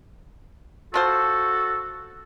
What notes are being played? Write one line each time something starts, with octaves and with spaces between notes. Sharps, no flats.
F3 F4 F#4 A4 C5